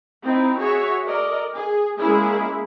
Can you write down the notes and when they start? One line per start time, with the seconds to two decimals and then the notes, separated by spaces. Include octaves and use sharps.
0.22 C4 D#4 E4
0.59 F#4 G#4 C#5 E5
1.07 A4 A#4 D5 D#5
1.54 G#4
1.99 G#3 A#3 C#4 E4 G#4